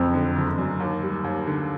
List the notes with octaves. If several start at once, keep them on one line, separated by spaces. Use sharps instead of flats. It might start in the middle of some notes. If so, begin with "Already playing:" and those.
Already playing: F#1 F2
D3
F#1
F#2
D#2
G3
D#2
D3